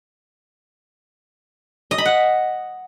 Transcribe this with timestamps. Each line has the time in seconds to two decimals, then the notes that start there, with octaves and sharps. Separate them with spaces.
1.91 D#5
1.98 B5
2.05 F#5